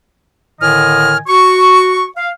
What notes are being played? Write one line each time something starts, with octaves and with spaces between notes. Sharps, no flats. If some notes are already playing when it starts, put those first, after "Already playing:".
A2 D3 D#3 D#5 G#5 F6
F#4 C#6
F5